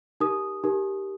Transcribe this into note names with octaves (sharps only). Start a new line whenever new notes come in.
D#4 G4 A#4 D#6
D#4 G4 A#4